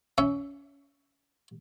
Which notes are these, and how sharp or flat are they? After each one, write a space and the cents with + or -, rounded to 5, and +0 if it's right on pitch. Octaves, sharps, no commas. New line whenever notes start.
C#4 +20 E5 +0